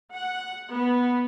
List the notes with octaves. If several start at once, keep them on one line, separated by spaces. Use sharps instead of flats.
F#5
B3